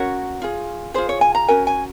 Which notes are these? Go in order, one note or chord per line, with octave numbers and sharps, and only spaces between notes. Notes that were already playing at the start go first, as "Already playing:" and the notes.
Already playing: C#4 F#4 A#4 C#5
F4 G#4
F4 G#4 C5
C#5
G#5
A#5
C#4 F#4 A#4 G#5
G#5